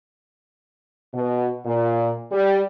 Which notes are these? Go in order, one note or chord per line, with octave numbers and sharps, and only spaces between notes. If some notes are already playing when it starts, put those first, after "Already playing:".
B2
A#2
G3